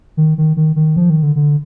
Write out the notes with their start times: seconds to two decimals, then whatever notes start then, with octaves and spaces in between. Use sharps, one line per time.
0.17 D#3
0.38 D#3
0.57 D#3
0.76 D#3
0.96 F3
1.10 D#3
1.23 D3
1.36 D3